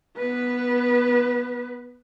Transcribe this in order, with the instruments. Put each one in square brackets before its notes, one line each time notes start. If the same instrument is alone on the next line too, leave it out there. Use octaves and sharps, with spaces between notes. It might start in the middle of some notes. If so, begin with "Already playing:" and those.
[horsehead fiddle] B3 B4